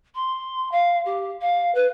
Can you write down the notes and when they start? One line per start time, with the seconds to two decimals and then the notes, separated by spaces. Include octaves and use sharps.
0.14 C6
0.71 F5
1.05 G4
1.41 F5
1.74 B4